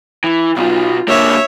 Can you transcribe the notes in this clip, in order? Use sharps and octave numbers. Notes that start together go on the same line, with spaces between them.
E3
B1 B2 F4
D3 A#3 C#5 E5